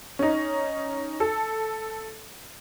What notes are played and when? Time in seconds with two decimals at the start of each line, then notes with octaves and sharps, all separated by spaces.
0.19 C#4 D#4
1.20 A4